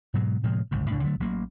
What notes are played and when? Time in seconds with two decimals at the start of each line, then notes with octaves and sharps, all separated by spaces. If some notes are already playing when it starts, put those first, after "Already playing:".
0.14 G#2 B2 F#3 G#3
0.43 A2 C3 F3 G#3
0.71 G1 C#2 A2
0.91 C#2 A2 D4
1.04 D3 F#3 A3
1.20 A1 F#3 A#3